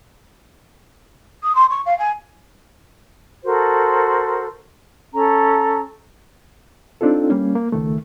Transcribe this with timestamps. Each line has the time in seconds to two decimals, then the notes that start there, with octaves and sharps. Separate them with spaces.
1.43 D#6
1.55 C6
1.70 C#6
1.86 F5
1.98 G#5
3.45 F#4 A4 A#4 C5
5.14 C#4 A4 A#5
7.01 C4 D4 D#4 F4 A4
7.30 G3 A#3 C#4
7.56 A#3
7.72 C#2 D#3 A3